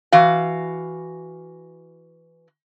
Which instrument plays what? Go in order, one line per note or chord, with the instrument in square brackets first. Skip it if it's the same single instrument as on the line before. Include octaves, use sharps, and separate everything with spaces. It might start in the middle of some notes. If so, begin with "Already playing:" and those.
[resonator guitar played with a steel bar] E3 F#4 F5